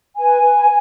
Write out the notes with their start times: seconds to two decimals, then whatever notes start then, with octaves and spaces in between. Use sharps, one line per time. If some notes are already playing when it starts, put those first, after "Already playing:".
0.17 B4 G#5
0.42 B4